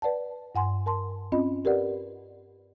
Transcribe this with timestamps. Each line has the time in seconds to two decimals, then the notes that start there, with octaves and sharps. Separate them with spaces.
0.02 B4 D5 F#5 A5
0.55 G2 F#5 G#5 C6
0.86 A#4 A5 C6
1.32 C4 C#4 F4 D#5 B5
1.65 G4 A#4 B4 D5 F#5